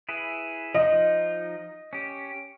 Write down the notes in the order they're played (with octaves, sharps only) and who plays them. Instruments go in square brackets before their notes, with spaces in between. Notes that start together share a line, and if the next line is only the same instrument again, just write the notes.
[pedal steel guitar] E4 G#4 B4
[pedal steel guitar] F3 D#4 [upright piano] D#5
[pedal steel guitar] C#4 G4